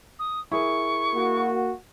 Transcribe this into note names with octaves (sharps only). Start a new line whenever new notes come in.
D#6
E4 G#4 A#4 C#6
A#3 F#4